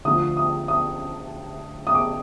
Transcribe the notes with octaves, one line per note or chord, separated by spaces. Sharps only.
D2 D3 F3 D#6
D#6
D#6
D#6
D6